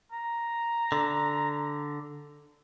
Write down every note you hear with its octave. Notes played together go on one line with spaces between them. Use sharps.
A#5
D3